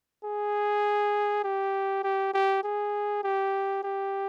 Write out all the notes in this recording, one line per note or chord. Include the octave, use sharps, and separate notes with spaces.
G#4
G4
G4
G4
G#4
G4
G4